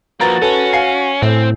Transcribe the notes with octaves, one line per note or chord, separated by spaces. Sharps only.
F3 A#3 F#4 B4 A#5 A6
C#4 A4 B4
F5 G#5 C7
A2 C4